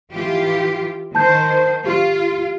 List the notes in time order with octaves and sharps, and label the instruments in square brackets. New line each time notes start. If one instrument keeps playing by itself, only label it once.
[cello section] E3 F4 G4
[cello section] D#3 C5 [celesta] A5 G6
[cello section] F4 [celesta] G4